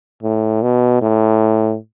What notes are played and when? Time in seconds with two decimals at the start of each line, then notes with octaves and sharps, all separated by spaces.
0.23 A2
0.63 B2
1.02 A2